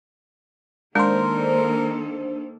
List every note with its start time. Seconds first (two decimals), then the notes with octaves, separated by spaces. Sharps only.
0.95 D#3 G#3 A#3 D4 A4 A#4 C5